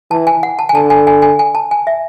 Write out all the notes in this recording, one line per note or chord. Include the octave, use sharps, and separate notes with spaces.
E3 A5
G#5
F#5
A5
G#5
D3 A5
G#5
G#5
G#5
G#5
A5
G#5
E5